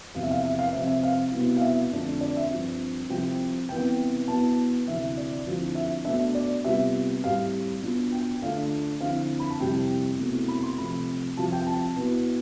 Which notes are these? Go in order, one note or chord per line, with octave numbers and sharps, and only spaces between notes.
E2 C3 F3 F5
E5
F5
E5
F5
C3 F3 C4 E5
E5
F5
C2 B2 B3 E4
F5
E5
F2 D3 A3 D4 F4
D5
E5
G2 F3 C4 F4
C2 C3 F3 C4 G5
C2 C3 E3 B3 G5
B2 B3 E4 A5
D2 C3 E3 E5
D5
D2 D3 F3 C4 E4
E5
B2 A3 D4 E5
D5
C3 G3 B3 F4 E5
A2 G3 C4 F5
B2 B3 D4 F4
G5
D3 A3 D4 F4 F5
D3 F3 C4 E4 F5
B5
A5
F2 C3 G3 C4 E4 G5
C2 B2 A3 C4 E4
B5
C6
C3 F3 A3 B5
C2 C3 F3 A5
G5
A5
B2 B3 E4